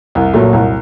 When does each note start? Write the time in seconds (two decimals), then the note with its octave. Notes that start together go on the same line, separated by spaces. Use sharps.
0.15 C2
0.34 A#2 F#3 A3
0.53 C2